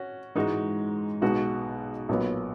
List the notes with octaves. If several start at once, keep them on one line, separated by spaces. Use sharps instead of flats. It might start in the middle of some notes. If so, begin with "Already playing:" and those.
Already playing: C#4 F#4
G#2 E3 G#3 D#4 F#4
B1 B2 G#3 D#4 F#4
B1 A#2 F#3 B3